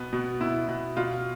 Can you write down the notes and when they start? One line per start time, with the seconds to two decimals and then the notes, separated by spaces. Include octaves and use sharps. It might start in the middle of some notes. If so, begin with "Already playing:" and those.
Already playing: B2 B3
0.13 B2
0.41 B2 E4
0.69 B2
0.97 B2 F4